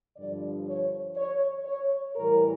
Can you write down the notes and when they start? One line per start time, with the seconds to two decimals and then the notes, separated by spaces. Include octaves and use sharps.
0.16 G2 D3 F3 D5
0.66 C#5
1.16 C#5
1.65 C#5
2.15 A2 E3 G3 A#4